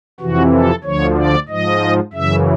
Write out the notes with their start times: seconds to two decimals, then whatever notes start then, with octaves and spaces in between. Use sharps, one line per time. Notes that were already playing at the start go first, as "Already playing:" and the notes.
0.20 F2 C3 E3 F#4
0.53 A4
0.84 D2 D3 F3 C#5
1.17 D5
1.48 G#2 F3 D#5
2.13 F#2 C#3 E3 E5